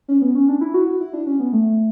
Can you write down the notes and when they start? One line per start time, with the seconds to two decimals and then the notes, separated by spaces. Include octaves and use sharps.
0.08 C#4
0.22 B3
0.35 C#4
0.48 D4
0.61 E4
0.74 F#4
0.87 F#4
1.01 E4
1.13 D4
1.27 C#4
1.40 B3
1.53 A3